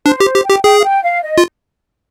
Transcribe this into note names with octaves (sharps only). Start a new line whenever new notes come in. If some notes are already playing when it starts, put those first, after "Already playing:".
D4 C5
G4
C5
G4
G4 G5
G#4 G5
F5
G5
F5
D#5
F4